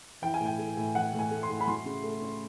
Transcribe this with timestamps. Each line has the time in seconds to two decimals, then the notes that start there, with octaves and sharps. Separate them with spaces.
0.22 E3 G5
0.34 G#5
0.40 A2 G5
0.59 A3
0.77 A2
0.95 E3 F#5
1.13 A2
1.19 G#5
1.31 A3
1.43 C6
1.49 A2
1.60 B5
1.68 F#3 C6
1.85 C#3
2.03 A3
2.22 C#4